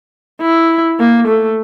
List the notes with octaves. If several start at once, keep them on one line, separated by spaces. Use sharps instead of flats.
E4
A#3
A3